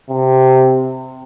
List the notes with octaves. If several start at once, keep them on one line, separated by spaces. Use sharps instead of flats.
C3